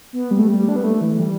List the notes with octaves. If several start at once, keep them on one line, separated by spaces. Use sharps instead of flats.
B3
G3
A3
G3
D4
B3
A3
E3
E3
G3